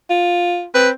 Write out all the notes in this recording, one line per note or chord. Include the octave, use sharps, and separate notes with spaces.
F4
C4 B4